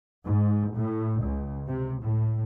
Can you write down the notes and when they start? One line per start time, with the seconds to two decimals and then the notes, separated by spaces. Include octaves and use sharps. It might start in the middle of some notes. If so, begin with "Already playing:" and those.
0.23 G#2
0.75 A2
1.22 C#2
1.68 C3
2.04 A2